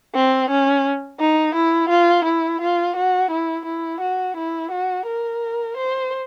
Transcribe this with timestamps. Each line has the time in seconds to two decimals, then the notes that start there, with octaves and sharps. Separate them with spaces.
0.15 C4
0.50 C#4
1.20 D#4
1.55 E4
1.90 F4
2.25 E4
2.61 F4
2.96 F#4
3.31 E4
3.65 E4
4.01 F#4
4.37 E4
4.71 F#4
5.07 A#4
5.77 C5